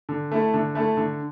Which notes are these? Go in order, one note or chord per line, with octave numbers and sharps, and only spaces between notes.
D3
A3 E4 A4
D3
A3 E4 A4
D3